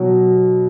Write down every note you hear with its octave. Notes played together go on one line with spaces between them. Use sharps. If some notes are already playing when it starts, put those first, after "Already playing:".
Already playing: B2 F#3